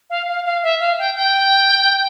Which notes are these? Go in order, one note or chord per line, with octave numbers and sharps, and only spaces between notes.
F5
F5
F5
E5
F5
G5
G5